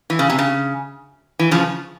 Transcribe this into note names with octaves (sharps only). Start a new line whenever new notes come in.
E3
C#3
C3
C#3
E3
C#3 F3